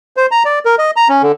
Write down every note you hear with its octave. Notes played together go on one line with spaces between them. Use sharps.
C5
A#5
D5
A#4
D#5
A#5
C#4
D3